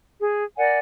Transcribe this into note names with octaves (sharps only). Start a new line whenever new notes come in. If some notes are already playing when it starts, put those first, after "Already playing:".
G#4
A#4 D5 F#5 G#5